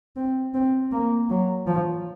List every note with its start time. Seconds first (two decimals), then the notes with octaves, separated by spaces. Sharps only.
0.16 C4
0.54 C4
0.92 A#3
1.30 F#3
1.67 F3